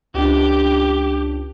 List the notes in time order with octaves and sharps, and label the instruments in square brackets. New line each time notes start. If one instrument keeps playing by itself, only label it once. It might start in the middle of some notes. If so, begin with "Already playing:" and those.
[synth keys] C#2 D4 [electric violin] G4